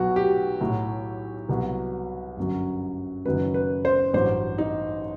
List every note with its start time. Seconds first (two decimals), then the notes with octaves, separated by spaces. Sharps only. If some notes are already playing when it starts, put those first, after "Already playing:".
Already playing: B1 B2 F#3 F#4
0.16 G4
0.61 B1 A2 F#3
1.49 C2 B2 F#3
2.37 G1 F#2 F#3
3.25 F#1 F#2 D#3 F#3 B4
3.54 B4
3.85 C5
4.13 A1 G2 F#3 C5
4.58 D#4